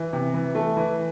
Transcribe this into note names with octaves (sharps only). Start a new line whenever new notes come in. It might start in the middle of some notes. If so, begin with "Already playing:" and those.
Already playing: E3
C3
E3
A3
E3